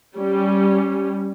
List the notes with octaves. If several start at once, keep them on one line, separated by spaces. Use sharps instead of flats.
G3 C#4